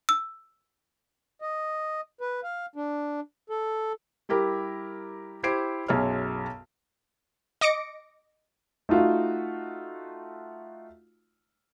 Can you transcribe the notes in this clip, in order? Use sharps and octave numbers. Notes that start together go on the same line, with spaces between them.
E6
D#5
B4
F5
D4
A4
G3 E4 G4 A#4
E4 G4 C5 G#6 C7 D7
B1 F#2 G#4 C#5 F6
D#5 D6 A#6 C#7 D7
A3 D#4 F4 F#4